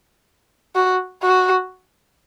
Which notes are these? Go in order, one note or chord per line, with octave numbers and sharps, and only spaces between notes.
F#4
F#4